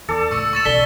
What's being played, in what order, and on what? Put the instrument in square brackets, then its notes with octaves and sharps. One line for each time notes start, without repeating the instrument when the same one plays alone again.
[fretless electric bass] E2 [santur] A4 D5
[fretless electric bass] C#2 A2 [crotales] C#6 E6 C#7
[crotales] C#6 A6 E7
[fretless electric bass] B1 E2 C#3 [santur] A4 [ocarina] D5 [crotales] B6 G7